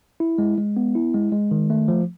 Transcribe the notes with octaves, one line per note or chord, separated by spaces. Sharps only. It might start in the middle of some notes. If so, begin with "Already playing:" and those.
E4
G#3
G#3
B3
E4
G#3
G#3
D#3
A3
F3